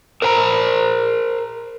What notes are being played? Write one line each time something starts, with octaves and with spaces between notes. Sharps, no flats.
A#4 C5 G5 A#5